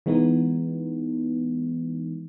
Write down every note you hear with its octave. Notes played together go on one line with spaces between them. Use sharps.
E3 G#3 B3 D#4